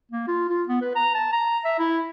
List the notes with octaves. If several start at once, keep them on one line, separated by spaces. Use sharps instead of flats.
A#3
F4
F4
B3
B4
A#5
A5
A#5
E5
E4